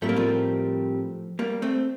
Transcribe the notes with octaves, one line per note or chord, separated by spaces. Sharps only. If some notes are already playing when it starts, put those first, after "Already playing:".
A2 G3 A3 C4 G4 A#4
A#3
F3 A3
G3 A#3
A3 C4